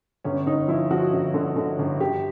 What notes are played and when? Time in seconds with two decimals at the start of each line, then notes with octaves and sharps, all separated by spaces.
0.24 G1 C#4
0.46 G1 D#4
0.68 F3 E4
0.90 F3 F#4
1.13 G1
1.34 D3
1.56 D3
1.79 G1
2.00 G1 G4